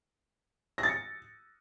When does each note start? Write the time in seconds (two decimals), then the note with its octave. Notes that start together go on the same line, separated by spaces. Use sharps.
0.78 A#6
0.83 A6
0.89 C#7